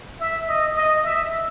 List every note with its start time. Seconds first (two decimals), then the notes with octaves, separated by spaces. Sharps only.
0.20 E5
0.48 D#5
0.76 D#5
1.04 E5